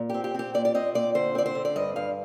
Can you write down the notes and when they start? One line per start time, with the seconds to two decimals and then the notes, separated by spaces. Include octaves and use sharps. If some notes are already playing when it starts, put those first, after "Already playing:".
Already playing: A#2
0.10 C4 G4
0.24 G4
0.34 C4 G4
0.54 A#2 D5
0.65 D5
0.74 C4 D#5
0.95 A#2 D5
1.15 D3 C5
1.35 C4 D5
1.46 C5
1.55 D3
1.65 D5
1.76 G2 D#5
1.96 G2 F5